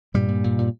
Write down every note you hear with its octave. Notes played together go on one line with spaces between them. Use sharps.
G2 A#2 G3
A#2
A#2
A#2